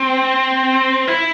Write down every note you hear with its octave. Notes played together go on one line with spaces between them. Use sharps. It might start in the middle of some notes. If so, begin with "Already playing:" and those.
Already playing: C4
E4